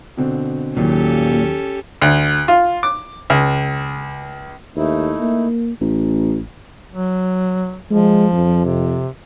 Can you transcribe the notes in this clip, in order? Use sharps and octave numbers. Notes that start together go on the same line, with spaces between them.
B2 D3 C4
D#2 A#2 D#3 F#3 C#4 G4 A4
D2
F4
D6
C#2
D#2 A3 D#4 E4
A#3
A1
F#3
F3 G#3
F2
C3